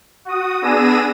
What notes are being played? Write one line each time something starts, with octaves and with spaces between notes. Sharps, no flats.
F#4 D#6
B3 D4 G#4 E6 A#6 D#7